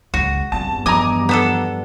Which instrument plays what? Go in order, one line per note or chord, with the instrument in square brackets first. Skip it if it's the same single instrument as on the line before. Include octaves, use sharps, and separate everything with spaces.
[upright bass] C#2 C#3 [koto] F#4
[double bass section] E2 G2 [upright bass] G3 C4 [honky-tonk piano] A5
[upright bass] F3 [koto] D#5 G#5 [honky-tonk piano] A#5 D6
[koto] B3 D4 A4